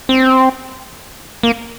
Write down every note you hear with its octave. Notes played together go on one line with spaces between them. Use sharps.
C4
A#3